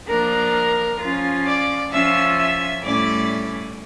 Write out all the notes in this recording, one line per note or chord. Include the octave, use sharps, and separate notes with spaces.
F3 A#3 D4 A#4 A#5
F3 C#4 F4
D5 D6
F3 C#4 F4 E5 E6
E5 E6
A2 G3 C#4 E4 D5 D6